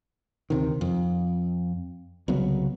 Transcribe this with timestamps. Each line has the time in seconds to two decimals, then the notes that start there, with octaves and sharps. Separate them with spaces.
0.50 D2 C3 D#3
0.81 F2
2.28 C2 C#3 F#3 B3